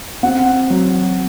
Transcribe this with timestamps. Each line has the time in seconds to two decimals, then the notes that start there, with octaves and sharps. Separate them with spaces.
0.23 C4 F#5
0.70 F#3